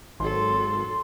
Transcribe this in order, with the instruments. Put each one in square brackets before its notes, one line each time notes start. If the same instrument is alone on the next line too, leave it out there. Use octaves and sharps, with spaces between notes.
[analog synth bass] G#1 [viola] F#3 A4 [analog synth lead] C6